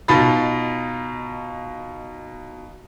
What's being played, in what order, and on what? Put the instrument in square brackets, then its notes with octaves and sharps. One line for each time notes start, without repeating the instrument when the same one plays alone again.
[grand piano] B2 D#4 F4 B5 A6